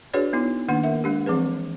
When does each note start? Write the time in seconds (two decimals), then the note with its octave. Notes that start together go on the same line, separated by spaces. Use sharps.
0.14 D4 F#4 G#4 B4 C#5 D5
0.33 B3 D#4 E4
0.68 D#3 A#3 D4 F#5
0.84 A#4 E5
1.04 G#3 D4 G4
1.26 E3 F3 C4 G#4 B4